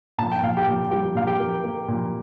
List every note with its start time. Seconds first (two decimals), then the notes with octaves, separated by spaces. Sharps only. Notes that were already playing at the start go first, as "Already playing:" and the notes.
0.18 A#2 A5
0.32 G5
0.42 A#2 F5
0.57 G4 G5
0.67 A#2
0.91 G3 G4 G5
1.15 A#2 F5
1.27 G4 G5
1.40 A#3
1.64 A#3
1.88 A#2